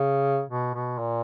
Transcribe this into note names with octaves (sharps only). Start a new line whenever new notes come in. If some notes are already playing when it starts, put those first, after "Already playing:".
Already playing: C#3
B2
B2
A#2